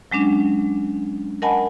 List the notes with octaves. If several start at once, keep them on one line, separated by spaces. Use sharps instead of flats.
F#3 G#3 C#4 D4
A#4 D#5 F#5 G#5 A5 B5